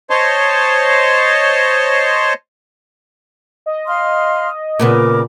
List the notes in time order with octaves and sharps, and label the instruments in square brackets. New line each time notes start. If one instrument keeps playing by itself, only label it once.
[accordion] C5 C#5 D#5 A5 C6
[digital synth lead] D#5
[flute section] F5 C6 F6
[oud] A#2 C#3 B3 [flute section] A#4 D6